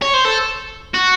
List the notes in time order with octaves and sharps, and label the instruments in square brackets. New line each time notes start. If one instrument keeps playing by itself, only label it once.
[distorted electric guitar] C#5
C5
A4
F#4